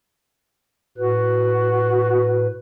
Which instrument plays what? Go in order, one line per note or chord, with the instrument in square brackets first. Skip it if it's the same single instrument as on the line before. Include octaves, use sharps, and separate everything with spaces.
[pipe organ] A2 B4 [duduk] F#4